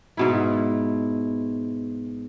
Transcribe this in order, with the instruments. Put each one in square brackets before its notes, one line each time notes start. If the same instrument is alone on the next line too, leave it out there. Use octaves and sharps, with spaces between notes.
[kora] G#2 B2 E4